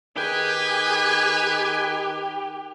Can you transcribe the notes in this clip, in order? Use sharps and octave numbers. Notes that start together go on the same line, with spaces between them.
D#3 G4 G#4 B4 G#5